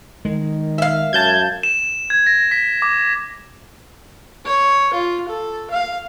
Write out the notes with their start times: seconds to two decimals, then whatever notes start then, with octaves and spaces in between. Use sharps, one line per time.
0.25 D#3 G#3
0.78 E5 F5
1.13 F#2 A5 G6 G#6
1.63 E7
2.10 G#6
2.26 A#6
2.51 B6
2.82 D6
4.45 C#5
4.93 F4
5.28 A4
5.70 F5